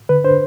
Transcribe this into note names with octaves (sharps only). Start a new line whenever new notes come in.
D3 B4
D4 C5